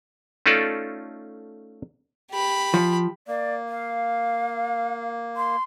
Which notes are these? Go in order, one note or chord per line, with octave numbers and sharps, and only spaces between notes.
A3 C#4 D#4 F4 A4 D5
G4 B5
F3
A#3 D5
F5
C6